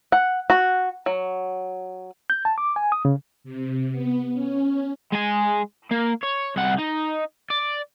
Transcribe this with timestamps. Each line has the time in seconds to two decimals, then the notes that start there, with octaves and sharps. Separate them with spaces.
0.12 F#5
0.50 F#4
1.06 F#3
2.30 G6
2.45 A5
2.58 D6
2.76 G#5
2.92 D#6
3.05 C#3
3.44 C3
3.91 B3
4.34 C#4
5.12 G#3 G#5
5.91 A#3
6.23 C#5
6.56 C2 F#5
6.78 D#4
7.50 D5